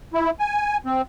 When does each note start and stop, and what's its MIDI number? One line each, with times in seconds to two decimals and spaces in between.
0.14 0.31 64
0.39 0.77 80
0.86 1.02 60